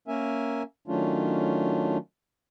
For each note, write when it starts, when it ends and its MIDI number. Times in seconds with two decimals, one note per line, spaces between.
0.08 0.63 58
0.08 0.63 61
0.08 0.63 70
0.08 0.63 76
0.08 0.63 80
0.88 1.98 51
0.88 1.98 54
0.88 1.98 57
0.88 1.98 61
0.88 1.98 62
0.88 1.98 65